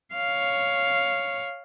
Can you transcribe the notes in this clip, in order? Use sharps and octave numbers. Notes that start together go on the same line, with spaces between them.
C#5 F5